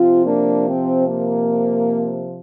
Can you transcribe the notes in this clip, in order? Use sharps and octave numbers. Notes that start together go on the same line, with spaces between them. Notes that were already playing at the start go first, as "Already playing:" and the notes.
Already playing: C3 F3 C4 F4
A#3 D4
C4
A#3